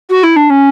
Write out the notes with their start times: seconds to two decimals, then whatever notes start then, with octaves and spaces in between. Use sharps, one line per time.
0.10 F#4
0.23 E4
0.36 D4
0.50 C#4